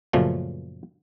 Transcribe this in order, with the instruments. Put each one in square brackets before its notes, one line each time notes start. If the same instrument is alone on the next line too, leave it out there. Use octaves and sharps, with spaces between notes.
[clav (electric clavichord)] F#2 A#2 C#3 F3 A3 C#4